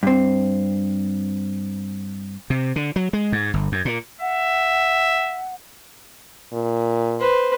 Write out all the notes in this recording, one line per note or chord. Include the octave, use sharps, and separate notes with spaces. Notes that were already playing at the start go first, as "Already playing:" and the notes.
G2 C4
C3
D3
F#3
G#3
G#2
G1
F#2
A#2
E5 F#5
A#2
B4 C5